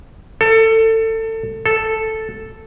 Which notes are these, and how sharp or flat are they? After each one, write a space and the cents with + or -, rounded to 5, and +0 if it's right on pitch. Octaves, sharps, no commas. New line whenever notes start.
A4 +25
A4 +0